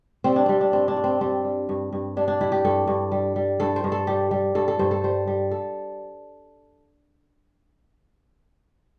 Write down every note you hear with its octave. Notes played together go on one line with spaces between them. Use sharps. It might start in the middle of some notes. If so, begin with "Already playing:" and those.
G3 C4
D4
G3 C4
D4
G2 C4
D4
G2
C4
G3 C4
G3
G2
G2
G3 D4
D4
G3 E4
G4
G2 A4
G2
G3
G3
G2 A4
C5
G2
A4
G3 G4
G3
G2 A4
A4
G2 C5
A4
G3 C5
G3
A4